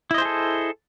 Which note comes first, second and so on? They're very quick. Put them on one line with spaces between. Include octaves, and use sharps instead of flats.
E4 D#5 C5 G#4 A4